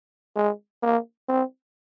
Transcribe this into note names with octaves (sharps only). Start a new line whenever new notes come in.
G#3
A#3
C4